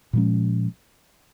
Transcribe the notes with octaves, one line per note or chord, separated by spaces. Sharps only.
A#2 F3 G#3 C#4